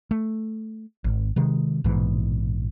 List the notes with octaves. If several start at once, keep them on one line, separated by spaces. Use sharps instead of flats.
A3
G#1
C3 D#3 G#3
A#1 G#2 B2 E3